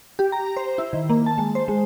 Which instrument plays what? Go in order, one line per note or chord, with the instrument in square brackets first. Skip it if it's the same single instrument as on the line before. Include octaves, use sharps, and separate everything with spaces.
[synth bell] G4
A#5
C5
E4
D#3
A#3
A5
G#3
C5
G#3